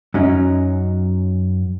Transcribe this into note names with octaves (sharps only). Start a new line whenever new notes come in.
F#2 F#3 C#4 D#4